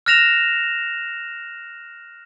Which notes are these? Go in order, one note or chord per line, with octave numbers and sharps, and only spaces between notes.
F6 F#6 A#6 E7 F7